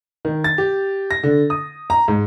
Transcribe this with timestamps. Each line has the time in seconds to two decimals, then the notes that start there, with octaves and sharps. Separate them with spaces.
0.25 D#3
0.44 A6
0.58 G4
1.11 A#6
1.23 D3
1.50 D#6
1.90 A#5
2.08 G#2